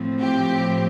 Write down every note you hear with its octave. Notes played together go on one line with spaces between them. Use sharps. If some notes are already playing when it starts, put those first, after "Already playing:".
Already playing: A2 F3 C4
G4